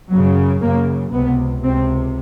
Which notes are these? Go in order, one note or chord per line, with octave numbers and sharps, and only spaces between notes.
F#2 C#3 F#3
F#2 C#3 A#3
C#2 C3 B3
C#2 C3 C4